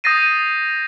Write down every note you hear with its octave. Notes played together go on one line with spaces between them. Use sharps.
D#6 G6 A6 A#6 C7 D#7